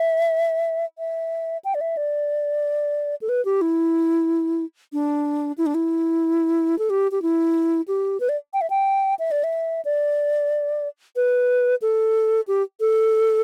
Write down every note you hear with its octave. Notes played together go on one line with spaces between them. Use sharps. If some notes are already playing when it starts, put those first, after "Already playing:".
Already playing: E5
E5
G5
D5
E5
D5
A4
B4
G4
E4
D4
E4
D4
E4
A4
G4
G4
E4
G4
B4
D5
G5
E5
G5
E5
D5
E5
D5
B4
A4
G4
A4